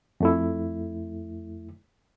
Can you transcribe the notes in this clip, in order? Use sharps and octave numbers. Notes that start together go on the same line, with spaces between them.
F2 A3 E4